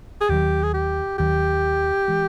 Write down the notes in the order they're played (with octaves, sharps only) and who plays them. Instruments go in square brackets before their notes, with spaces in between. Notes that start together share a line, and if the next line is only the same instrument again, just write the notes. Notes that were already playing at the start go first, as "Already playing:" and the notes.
[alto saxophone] G#4
[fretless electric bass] D#2 D#3 F#3 [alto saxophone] G4
[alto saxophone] G#4
G4
[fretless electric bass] D#2 D#3 F#3 [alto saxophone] G4
[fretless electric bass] E3 G#3